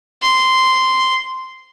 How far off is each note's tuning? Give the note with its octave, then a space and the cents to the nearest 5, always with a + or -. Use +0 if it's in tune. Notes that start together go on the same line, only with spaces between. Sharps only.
C6 -10